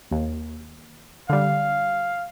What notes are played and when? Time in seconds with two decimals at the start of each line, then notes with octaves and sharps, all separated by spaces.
0.11 D#2
1.29 D3 G3 F5